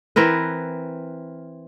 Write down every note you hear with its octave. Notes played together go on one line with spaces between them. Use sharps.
E3 C4 A#4 B4